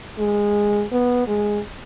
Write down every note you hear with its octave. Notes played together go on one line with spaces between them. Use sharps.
G#3
B3
G#3